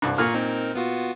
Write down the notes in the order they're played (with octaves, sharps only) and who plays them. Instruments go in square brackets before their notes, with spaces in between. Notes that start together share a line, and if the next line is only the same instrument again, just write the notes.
[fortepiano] C2 G2
[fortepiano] A#2 F6 [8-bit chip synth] F4 A#5 C#6
[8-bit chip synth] C4 D#4 A#4
B3 F4 F#4